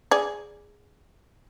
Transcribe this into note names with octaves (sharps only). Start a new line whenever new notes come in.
G#4 D5